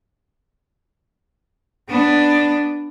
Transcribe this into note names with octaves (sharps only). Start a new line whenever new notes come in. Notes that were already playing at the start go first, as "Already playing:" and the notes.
B3 D4